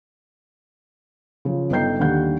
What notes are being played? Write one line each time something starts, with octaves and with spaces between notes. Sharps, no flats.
C#3 F3
G1 D#4 A4 G5 G6 C7
D#2 D3 G3 F#5 G6